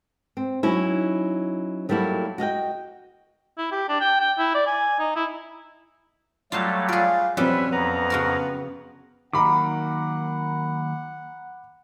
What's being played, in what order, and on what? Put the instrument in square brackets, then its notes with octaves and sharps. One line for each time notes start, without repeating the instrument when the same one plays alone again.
[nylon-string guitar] C4
F#3 C#4 D#4 E4
F#3 G3 A3 A#3 E4 F#4
F#4 D#5 F5 G5
[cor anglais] E4
G4
D4
G5
G5
E4
D5
G#5
D#4
E4
[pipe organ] F#3 G3 A3 [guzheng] F4 F5 A5
[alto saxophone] F4 [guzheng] G#4 D5
[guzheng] F#2 G3 [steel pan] F3 C4 [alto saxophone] C#4 [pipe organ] B4 E5
[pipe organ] F2 A#5 [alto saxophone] B3
[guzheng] C#3 F#4 A#4
[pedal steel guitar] D#3 F#3 A#3 [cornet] F#5 [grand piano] A#5 B5 D6